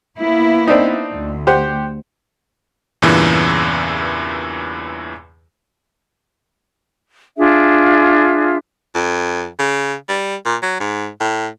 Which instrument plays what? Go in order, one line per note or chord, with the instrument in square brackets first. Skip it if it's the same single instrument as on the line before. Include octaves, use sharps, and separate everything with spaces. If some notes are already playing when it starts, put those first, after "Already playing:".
[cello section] A#3 B3 E4
[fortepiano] C4 D4 D#4
[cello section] D2
[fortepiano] G4 C5 F#5
[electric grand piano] E2 G2 A#2 C#3 E3
[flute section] D4 F4 G#4 E5
[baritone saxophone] F2
C#3
G3
A#2
F#3
G#2
A2